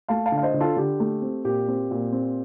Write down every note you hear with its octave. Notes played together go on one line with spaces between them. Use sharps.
A3 F5 A5
F5 A5
D3
F5
C5 D#5
D3
F4 A4
D3 G4
A3
C4
A#2 G4
C4
A#2
C4